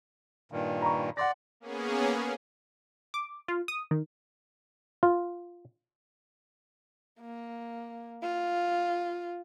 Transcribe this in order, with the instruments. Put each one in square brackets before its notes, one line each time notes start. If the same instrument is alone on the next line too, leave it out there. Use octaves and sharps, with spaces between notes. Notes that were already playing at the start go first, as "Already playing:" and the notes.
[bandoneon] G2 A#2 D#3
[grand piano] A#5 B5 C#6
[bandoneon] D5 [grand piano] F#5 C6 A#6
[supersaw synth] A#3 B3 C#4 G#4
[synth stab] D6
F4
D#6
D#3
[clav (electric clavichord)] F4
[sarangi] A#3
F4